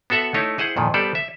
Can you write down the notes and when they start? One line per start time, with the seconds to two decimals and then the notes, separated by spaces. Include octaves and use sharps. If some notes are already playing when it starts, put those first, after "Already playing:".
0.10 B3 F#4 A4 E5 F#5
0.34 A3 D#4 E4 C#5
0.58 E4 G#4 C5 F#5
0.77 F2 A#2 D#3
0.94 G3 B3 A4 C5 D5
1.15 E5